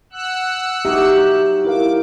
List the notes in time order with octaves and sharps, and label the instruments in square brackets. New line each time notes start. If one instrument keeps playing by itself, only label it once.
[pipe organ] F#5 E6 F#6
[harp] F#3 D#4 [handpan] G4 [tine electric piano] E5
[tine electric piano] E4 A#4 F5 [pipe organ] D6